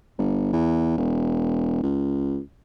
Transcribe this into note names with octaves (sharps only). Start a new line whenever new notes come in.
G1
E2
E1
C#2